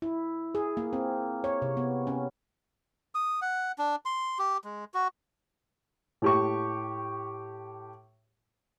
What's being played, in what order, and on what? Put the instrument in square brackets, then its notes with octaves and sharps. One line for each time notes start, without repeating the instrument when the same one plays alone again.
[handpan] E4
G#4
A#3
C4
C#5
C3
B3
C#4
[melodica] D#6
F#5
D4
C6
G4
G#3
F#4
[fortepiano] A2 G4 C#6